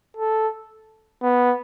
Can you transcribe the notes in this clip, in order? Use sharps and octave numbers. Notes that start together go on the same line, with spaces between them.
A4
B3